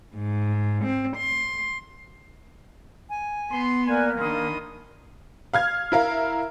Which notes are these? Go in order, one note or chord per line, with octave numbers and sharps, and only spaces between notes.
G#2
C4
C6
G#5
B3 C6
A#3 D5 G#5 F#6
D#3 D4 B5 C6 D#6
F5 F6 G#6
E4 A#4 F5